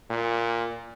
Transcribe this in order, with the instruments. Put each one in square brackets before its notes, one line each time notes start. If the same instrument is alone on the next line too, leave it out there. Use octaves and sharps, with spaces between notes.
[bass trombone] A#2